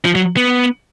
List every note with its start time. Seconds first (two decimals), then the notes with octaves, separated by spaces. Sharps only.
0.05 F3
0.15 F#3
0.37 B3